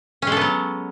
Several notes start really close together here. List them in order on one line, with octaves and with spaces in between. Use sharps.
C#4 G#3 A4 B3 F#3